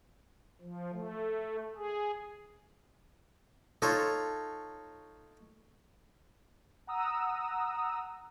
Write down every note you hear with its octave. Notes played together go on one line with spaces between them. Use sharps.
F3
A3
G#4
D#4 F4 A4 C#5
F#5 A#5 D#6 E6